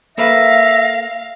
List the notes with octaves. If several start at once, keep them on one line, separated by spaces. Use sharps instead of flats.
A#3 A4 B4 E5 F5 A#6